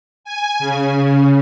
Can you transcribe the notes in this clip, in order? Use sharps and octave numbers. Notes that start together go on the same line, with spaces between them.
G#5
C#3